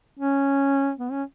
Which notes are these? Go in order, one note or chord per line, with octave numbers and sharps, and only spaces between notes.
C#4
B3
C#4